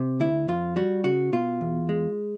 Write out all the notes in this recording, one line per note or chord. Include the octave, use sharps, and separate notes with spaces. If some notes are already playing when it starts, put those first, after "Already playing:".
Already playing: C3
D2 E4
F2 F4
G3 F#4
C#3 F#4
B2 F4
E2
G#3